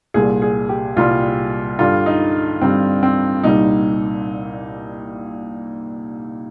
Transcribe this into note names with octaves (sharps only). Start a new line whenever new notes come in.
C2 A#2 G3 G#4
G#4
G4
C2 A#2 G3 F4
G2 D3 G3 F4
D#4
G2 D3 G3 C4
C4
C2 A#2 G3 D#4